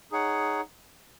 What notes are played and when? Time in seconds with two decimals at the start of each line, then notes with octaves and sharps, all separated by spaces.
0.12 D#4 G#4 C#5 F#5